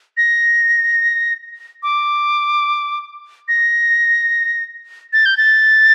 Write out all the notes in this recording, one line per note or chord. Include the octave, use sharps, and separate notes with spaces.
A#6
D6
A#6
A6
G6
A6